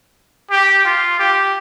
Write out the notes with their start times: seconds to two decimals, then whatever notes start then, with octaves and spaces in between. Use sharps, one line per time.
0.51 G4
0.85 F4
1.19 G4